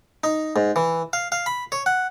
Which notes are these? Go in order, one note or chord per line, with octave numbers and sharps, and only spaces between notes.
D#4
G#2
E3
F5
F5
B5
C#5
F#5